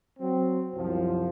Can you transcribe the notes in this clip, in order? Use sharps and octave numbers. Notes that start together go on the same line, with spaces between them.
F#3 C4
C2 F#2 F3